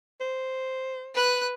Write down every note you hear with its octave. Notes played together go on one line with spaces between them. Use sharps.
C5
B4 F#6